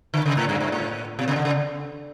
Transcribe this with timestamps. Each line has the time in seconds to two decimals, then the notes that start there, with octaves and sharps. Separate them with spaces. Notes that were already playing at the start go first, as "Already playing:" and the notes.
0.14 D3
0.26 C#3
0.37 A2
0.49 G2
0.61 G2
0.72 A2
1.19 B2
1.28 C#3
1.36 D3
1.45 C#3